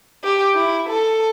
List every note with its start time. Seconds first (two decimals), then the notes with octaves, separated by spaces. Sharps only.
0.24 G4
0.55 E4
0.88 A4